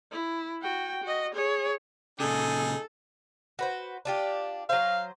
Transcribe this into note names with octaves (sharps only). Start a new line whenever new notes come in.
E4
F#4 G5
F#4 D#5
G#4 C#5
A#2 C#3 D#4 G#4 A4
F#4 B4 C5
D4 F4 G4
F#3 C5 F5